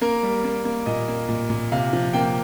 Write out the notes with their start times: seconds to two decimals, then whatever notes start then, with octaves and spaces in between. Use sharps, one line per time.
0.01 A#3 A#4
0.23 G3
0.45 A#3
0.65 A#3
0.86 A#2 D#5
1.08 A#3
1.29 A#2
1.50 A#2
1.72 C3 F5
1.93 F3
2.13 A#3 G5